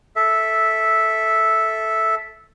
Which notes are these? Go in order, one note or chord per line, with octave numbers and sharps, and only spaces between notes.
A4 E5